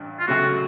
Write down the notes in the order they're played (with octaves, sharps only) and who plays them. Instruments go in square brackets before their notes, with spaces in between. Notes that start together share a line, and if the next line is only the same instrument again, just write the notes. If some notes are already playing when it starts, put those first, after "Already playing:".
Already playing: [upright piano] A1 G2
[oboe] F4
[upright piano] C#2 C#3 F#3 A3 [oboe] F#4